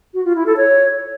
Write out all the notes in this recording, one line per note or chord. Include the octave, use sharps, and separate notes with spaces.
F#4
F4
E4
A4
C#5